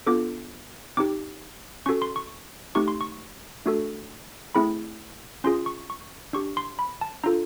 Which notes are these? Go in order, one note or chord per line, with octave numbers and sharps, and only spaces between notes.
B3 D4 F4 A4 D6
C4 D#4 G4 D6
C#4 F#4 A4 C#6
C6
C#6
A3 C4 D#4 G4 C#6
C6
C#6
A3 D4 F#4 A4
A3 C4 E4 G#4 B5
C#4 F4 G#4 C6
C#6
C#6
D4 G4 C#6
C6
B5
A5
D4 F4 A4 A#5